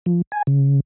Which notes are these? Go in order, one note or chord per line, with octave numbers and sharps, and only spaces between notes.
F3
G#5
C#3